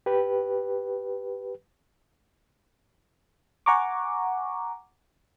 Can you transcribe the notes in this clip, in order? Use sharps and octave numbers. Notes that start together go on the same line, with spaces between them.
G4 B4
F#5 G#5 A#5 C#6 D6